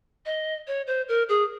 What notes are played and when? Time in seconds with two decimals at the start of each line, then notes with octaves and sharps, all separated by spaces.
0.26 D#5
0.67 C#5
0.87 C5
1.08 A#4
1.29 G#4